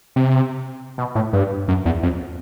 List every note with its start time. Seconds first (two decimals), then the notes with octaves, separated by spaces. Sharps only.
0.16 C3
0.98 B2
1.15 A2
1.33 G2
1.68 F#2
1.85 E2
2.03 F2